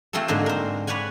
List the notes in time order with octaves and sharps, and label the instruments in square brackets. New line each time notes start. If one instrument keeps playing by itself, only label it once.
[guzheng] A3 C4 F4 G#4 A4
G#2 D3 A#3 G#4 C5
A#4 C5
B4 C#5 D5 F#5 G#5